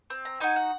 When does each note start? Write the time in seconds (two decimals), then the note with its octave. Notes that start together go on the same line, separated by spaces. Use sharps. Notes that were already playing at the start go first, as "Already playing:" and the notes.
0.10 C4
0.25 A#5
0.40 D#4 F#4 G#5
0.56 F#5